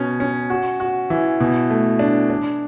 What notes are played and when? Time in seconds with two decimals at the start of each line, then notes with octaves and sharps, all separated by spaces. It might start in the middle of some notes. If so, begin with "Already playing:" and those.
Already playing: B2 C#4
0.20 C#4
0.50 F#4
0.80 F#4
1.10 E3
1.40 B2
1.70 A3
1.99 D4
2.30 D4